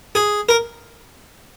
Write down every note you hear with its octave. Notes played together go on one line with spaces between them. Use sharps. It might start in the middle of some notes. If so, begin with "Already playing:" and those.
G#4
A#4